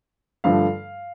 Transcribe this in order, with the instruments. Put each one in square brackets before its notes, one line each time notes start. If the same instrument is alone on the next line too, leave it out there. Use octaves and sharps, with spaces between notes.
[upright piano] G2 D3 F3 A3 F5